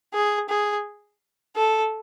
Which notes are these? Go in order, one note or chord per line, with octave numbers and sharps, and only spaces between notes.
G#4
G#4
A4